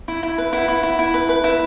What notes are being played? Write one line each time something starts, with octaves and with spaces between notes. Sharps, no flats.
E4
E4
B4
E4 F#5
E4
E4
E4
B4
B4
E4